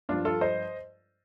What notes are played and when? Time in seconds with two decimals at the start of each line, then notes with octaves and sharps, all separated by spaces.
0.09 G2 F3 D4 F4
0.25 F4 A4
0.41 C5 D#5